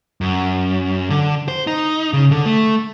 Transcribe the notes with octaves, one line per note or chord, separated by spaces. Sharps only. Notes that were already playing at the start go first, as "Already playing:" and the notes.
F#2
D3
C5
D#4
C#3
D3
A3